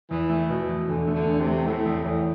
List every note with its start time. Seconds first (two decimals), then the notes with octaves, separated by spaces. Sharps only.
0.11 E2 E3
0.30 A3
0.50 B2
0.69 E2
0.88 E2 D3
1.07 A3
1.14 D3
1.27 E2
1.40 C3
1.47 A3
1.66 A2 A3
1.86 E2
2.05 E2 A2